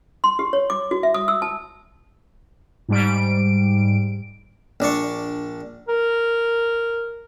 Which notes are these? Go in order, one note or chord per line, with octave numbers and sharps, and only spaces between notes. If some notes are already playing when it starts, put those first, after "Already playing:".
C6
G4
C#5
D6
F#4
E5
D#6
E6
A5
G#2 G3 D7
A#1 D4 D5 C#6
A#4